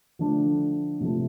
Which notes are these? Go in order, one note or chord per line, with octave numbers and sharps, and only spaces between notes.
D3 F3 A3 D4
C3 F3 A3